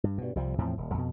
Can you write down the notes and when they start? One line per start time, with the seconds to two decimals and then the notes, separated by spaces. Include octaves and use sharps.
0.04 G2
0.18 G2 B2
0.35 C2 C3 F3 G3
0.58 E2 A2 F3 C4
0.77 D#1
0.94 F2 B2